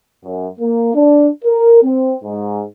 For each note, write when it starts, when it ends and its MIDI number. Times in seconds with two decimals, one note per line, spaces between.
0.24 0.47 42
0.60 0.95 58
0.95 1.27 62
1.45 1.81 70
1.83 2.17 60
2.24 2.63 44